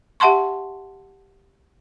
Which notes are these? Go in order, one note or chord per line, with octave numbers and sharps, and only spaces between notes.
G4 E5 F#5 A5 C6 C#6